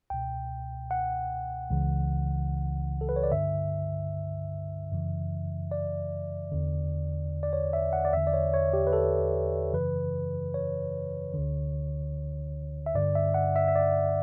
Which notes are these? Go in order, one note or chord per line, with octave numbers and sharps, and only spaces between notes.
C#2 B2 G5
F#5
C#2 C#3 E3
A4
B4
C#5
D5
G2 D3 E5
F#2 C#3 E3
D5
E2 D3
D5
C#5
E5
F#5
D5
E2 D3 E5
D5
C#5
C#5
G4
B4
A4
F#2 C#3 E3 B4
C#5
D2 D3
E5
G2 D3 D5
E5
F#5
E5
E5
D5